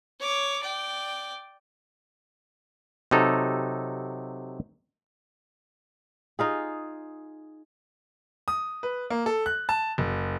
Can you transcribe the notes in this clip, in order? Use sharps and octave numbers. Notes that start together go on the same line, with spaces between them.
C#5 D6
D5 G5
C3 F#3 D#4 A4
D#4 F4 G#4
D#6
B4
A#3
A4
F#6
A5
F#1